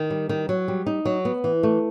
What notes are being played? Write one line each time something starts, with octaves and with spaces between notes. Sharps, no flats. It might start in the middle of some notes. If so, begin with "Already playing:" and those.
Already playing: D#3
G3
D#3
F#3
G3
D#4
F#3
B3
E3
A3